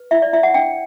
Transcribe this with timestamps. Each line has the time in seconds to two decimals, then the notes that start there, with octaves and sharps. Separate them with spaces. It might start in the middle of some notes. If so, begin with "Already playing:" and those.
Already playing: B4
0.11 E4 E5
0.22 D5
0.33 E4 E5
0.43 F#5
0.54 D4 G5